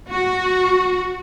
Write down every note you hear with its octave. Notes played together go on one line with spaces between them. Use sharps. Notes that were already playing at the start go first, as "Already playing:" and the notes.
F#4